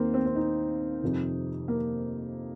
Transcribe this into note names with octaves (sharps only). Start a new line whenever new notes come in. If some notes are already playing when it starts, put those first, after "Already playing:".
Already playing: D#2 D#3 A#3 C4
C4
C4
D#4
F2 C3 D#3
A#3